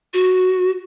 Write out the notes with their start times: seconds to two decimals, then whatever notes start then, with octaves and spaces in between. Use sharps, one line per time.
0.14 F#4